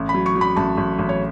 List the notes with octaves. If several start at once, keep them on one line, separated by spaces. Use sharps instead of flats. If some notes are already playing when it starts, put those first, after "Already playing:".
Already playing: A1
B5
F#3
C#6
F#3
B5
A1 A5
A1
A1
C#5